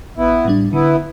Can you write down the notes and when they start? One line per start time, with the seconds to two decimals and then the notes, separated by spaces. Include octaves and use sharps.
0.17 A1 B3 E4
0.45 A2 G3 D4
0.72 D3 B3 E4